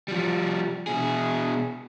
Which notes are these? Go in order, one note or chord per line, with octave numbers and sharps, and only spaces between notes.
F3 G3
B2 G#4